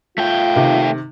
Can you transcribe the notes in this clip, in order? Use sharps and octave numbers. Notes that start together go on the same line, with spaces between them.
A3 F4 G5
C3 D#3